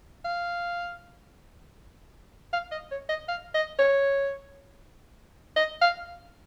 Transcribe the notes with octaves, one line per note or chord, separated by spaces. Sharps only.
F5
F5
D#5
C#5
D#5
F5
D#5
C#5
D#5
F5